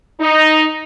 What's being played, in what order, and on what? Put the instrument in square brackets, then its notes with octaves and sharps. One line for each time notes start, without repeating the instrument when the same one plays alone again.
[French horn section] D#4